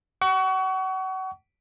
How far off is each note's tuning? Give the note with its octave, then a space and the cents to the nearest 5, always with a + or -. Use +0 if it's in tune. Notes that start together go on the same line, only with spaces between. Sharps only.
F#5 +35 C#6 +30